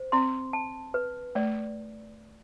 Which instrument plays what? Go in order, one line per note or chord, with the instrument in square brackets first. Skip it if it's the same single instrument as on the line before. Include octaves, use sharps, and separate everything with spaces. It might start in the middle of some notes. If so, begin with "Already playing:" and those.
Already playing: [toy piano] C5
[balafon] C4 [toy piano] C6
[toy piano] A5
B4
[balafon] A3 [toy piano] D5